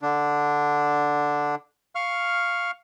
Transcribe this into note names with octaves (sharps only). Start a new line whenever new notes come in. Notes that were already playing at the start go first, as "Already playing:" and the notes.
D3 D4
F5 C#6 F6